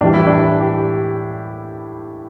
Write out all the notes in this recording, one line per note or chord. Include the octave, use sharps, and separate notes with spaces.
A2 E3 G3 D4
E4
D4
G4